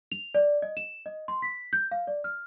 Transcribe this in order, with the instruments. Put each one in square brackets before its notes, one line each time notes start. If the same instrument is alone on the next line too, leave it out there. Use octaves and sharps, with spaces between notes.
[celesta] F7
D5
D#5
E7
D#5
C6
B6
G6
F5
D5
F6